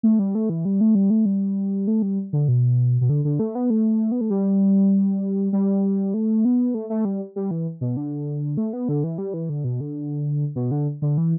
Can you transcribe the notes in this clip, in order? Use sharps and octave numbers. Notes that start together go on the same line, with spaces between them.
A3
G3
A3
E3
G3
A3
G3
A3
G3
A3
G3
D3
B2
B2
D3
D3
A3
B3
A3
B3
A3
G3
G3
A3
B3
A3
A3
G3
G3
E3
B2
D3
A3
B3
D3
E3
G3
E3
D3
B2
D3
B2
D3
D3
E3